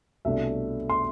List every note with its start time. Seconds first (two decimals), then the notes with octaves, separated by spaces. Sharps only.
0.25 C2 B2 A3 D4 E5
0.90 C6